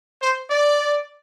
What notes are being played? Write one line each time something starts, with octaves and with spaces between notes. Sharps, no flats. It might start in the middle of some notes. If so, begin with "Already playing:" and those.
C5
D5